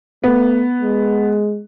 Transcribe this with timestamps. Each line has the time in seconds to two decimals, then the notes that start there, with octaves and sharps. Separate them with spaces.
0.24 A3 B3
0.81 G#3